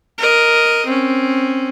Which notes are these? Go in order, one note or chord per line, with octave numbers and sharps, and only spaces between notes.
A#4 D#5
C4 C#4